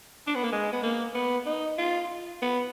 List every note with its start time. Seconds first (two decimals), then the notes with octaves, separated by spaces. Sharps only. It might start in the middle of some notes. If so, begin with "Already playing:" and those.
0.27 D4
0.35 B3
0.44 A#3
0.52 G#3
0.72 B3
0.83 A#3
1.15 B3
1.46 D#4
1.78 F4
2.42 B3